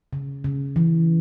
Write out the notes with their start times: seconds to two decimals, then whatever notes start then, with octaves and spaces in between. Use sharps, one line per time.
0.13 C#3
0.44 C#3
0.76 E3